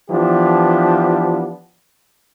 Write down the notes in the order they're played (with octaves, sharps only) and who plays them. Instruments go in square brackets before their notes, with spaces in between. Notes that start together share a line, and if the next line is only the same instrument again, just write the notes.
[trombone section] E3 F3 B3 D4 G4